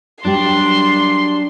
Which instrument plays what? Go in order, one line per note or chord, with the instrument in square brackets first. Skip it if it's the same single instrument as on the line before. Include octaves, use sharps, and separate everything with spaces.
[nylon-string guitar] F#3 G3 G4 [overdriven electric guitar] D4 [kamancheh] C6